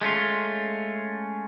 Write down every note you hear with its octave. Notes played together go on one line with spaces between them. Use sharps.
G#3 A3 C#4 F4